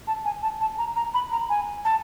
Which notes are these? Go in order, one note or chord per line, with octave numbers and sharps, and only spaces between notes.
A5
G#5
A5
A5
A#5
A#5
B5
A#5
G#5
A5